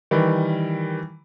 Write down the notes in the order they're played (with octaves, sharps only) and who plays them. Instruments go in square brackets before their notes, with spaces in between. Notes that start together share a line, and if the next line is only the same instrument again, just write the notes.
[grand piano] D#3 E3 G3